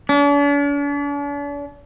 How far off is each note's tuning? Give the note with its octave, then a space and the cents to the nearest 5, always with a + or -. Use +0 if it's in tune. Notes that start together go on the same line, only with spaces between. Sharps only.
D4 -45